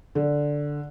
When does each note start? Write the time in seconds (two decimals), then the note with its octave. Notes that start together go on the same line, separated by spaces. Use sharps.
0.15 D3